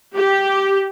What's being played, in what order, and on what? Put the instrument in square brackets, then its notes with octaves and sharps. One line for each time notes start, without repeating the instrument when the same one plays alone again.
[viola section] G4